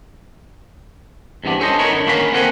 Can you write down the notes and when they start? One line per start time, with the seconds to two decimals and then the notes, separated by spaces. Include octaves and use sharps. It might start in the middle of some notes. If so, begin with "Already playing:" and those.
1.44 E2 G2 C3 B3 D4
1.60 C#4 A4 C5 D#5
1.78 D#4 E4 A#4 B4 C#5
1.91 F#2 D3
2.06 D#3 A#3 C#4 F#4 F5 B5
2.32 A#3 C4 A4 F#5 G#5